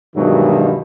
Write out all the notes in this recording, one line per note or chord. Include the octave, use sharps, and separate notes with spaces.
G2 B2 D#3 E3 F#3 G#3